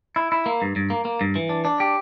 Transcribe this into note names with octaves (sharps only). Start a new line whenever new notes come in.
E4
E4
A#3
G2
G2
A#3
A#3
G2
E3
D4
D4
G4